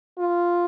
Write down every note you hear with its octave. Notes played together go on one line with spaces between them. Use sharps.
F4